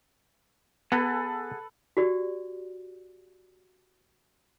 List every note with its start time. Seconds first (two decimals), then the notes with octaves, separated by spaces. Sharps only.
0.92 B3 G#4 A4 B4 F#5 G#5
1.97 F#4 G4 D5